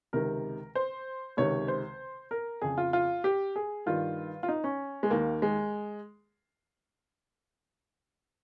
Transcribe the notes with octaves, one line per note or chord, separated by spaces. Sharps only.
C#2 C3 D#3 A#4
C5
C#2 C3 D#3 C#5
C5
A#4
F2 C#3 G#4
F4
F4
G4
G#4
G2 D#3 F4
F4
D#4
C#4
G#3
D#2 D#3 A#3
G#3